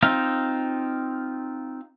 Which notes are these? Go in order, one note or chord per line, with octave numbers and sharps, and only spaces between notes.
C4 D#4 F4 F5